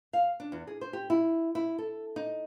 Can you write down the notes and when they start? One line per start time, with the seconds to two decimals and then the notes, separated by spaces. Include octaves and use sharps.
0.13 F5
0.40 D4
0.52 E2
0.67 G#4
0.81 C5
0.93 G4
1.10 E4
1.55 E4
1.78 A4
2.16 D#4